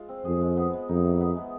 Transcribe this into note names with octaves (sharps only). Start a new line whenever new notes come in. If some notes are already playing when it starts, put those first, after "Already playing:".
Already playing: G#3 F4
C4
F2 G#4
G#3
B3
G#3
F2 D#4
E3
B3
G#3